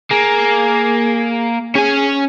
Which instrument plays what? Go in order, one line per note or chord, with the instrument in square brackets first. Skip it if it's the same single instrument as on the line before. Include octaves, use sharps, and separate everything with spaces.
[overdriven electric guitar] A#3 [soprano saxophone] G#4
[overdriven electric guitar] C#4 G#5 [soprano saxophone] G#4